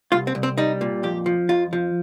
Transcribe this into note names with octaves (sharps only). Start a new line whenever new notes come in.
C2 F4
C4
C2
C4
G3 D#4
A#2
F2 G4
F3
F2 F4
F3